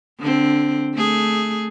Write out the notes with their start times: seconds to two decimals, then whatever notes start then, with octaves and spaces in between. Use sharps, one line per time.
0.20 D3 C4
0.94 A3 G#4